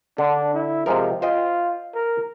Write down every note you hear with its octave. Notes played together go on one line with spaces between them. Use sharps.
D3 D4
E4
C3 F3 G#3 A#4
F4 C5 D#5 G5
A#4